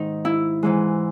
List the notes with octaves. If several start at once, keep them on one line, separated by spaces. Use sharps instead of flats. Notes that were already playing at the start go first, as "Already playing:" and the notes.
Already playing: G#2 D#3 D#4
E4
G#2 E3 G#3